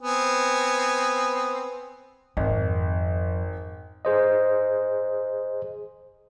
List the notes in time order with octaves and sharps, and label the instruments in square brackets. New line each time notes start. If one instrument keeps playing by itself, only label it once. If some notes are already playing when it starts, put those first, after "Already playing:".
[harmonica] B3 C4 G#5
[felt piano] G#1 [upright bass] F2
[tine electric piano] G#4 C5 D#5